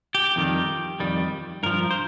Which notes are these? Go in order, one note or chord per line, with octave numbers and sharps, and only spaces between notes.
G4
F2 D#3 G3
F2 D#3 G3
G2 F3 A#4
C5